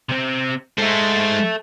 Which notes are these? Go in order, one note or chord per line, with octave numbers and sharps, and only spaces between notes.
C3 C4
G#3 A4 C5 E5